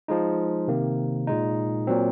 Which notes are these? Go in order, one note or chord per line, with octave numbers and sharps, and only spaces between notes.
F3 G#3 D#4
C3 D#3 A#3
A#2 G#3 D#4
A#2 F#3 C4